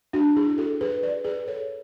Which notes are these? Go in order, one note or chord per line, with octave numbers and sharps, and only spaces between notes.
D4 F#4
E4 G#4
F#4 A4
G#4 B4
B4 D5
G#4 B4
A4 C#5